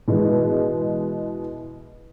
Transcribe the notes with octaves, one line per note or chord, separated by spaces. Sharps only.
B2 E3 G#3